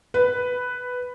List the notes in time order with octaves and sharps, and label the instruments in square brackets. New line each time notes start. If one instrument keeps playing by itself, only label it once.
[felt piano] B4